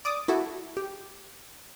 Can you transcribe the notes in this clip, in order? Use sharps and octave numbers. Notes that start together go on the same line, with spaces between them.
D5 D6 D#6
E4 F#4 A4
G4